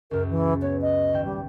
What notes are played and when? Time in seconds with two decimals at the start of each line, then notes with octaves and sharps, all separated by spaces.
0.11 C#2 F#2 A#4
0.30 E3
0.62 B3 C#5
0.81 D#5
1.13 G#1 E5 G5
1.25 G3